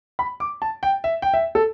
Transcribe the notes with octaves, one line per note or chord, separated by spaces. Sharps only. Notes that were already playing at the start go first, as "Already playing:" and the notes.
B5
D6
A5
G5
E5
G5
E5
A4